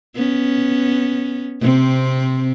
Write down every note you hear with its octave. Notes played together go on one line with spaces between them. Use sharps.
B3 C#4
C3 C4